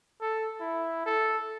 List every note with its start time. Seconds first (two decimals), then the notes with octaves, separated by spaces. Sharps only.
0.21 A4
0.60 E4
1.06 A4